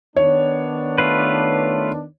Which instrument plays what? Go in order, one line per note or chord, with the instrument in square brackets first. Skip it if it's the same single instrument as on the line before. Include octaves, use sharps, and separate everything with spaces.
[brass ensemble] D#3 B3 D4 [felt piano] C#5
[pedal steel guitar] A3 F4 B4